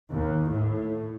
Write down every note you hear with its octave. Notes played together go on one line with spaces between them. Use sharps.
D#2
A2